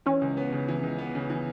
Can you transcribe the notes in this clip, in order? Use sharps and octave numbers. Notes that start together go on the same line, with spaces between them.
E3 C#4
C#2
B3
C#3
E3
C#2
B3
C#3
E3